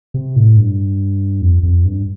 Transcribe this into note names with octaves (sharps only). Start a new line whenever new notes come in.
C3
A2
G2
F2
F2
G2